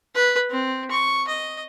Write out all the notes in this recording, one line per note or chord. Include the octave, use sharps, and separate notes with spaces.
B4
C4
C#6
D#5